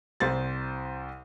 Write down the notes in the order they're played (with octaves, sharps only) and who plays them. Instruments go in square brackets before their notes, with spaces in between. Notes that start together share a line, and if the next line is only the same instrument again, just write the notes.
[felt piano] C2 C5 A6